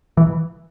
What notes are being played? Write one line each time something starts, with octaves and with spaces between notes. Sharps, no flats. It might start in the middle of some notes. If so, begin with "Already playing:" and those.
E3